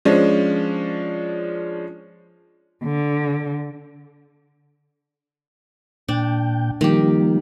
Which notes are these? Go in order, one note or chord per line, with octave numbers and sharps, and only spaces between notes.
F3 G#3 C#4 D4
D3
A#2 D4 G5
D#3 F3 G3 A#3 G4